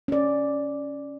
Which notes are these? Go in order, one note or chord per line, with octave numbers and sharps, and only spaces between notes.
C#4 D5